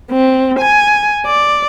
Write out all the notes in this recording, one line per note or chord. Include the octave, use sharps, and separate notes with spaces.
C4
G#5
D5